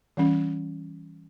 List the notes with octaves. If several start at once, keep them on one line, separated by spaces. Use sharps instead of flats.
E3 G3 C#4